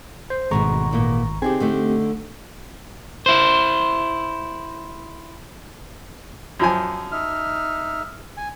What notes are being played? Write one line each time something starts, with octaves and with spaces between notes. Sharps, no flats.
C5
G#1 D2 B2 G#3 A#5 C#6
E2 A#2 A#3
D3 C4 D#4 G4 G#4
D3 A3 D#4
E4 C5
F#2 F3 G#5
D#4 E5 F6
G#5